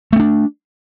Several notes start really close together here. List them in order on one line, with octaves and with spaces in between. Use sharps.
A3 C4 D4